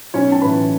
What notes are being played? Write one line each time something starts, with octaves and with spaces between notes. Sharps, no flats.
B1 C#4 C#5
A5
A2 E3 B4 B5